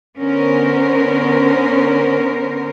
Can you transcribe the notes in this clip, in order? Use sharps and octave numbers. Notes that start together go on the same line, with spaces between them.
D3 B3 C#4 A#4 C5